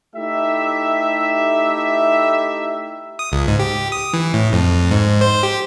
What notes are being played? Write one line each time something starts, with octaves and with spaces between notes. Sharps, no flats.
A3 D#4 E4 G4 E5
D#6
C#2
G#2
G4
D#6
E3
A2
F2
G#2
C5
G4